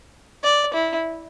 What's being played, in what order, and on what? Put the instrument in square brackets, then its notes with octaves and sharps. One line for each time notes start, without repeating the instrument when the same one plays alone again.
[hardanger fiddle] D5
E4